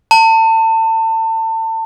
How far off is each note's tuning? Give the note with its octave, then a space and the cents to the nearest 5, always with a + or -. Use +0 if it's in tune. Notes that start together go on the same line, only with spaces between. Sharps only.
A5 +30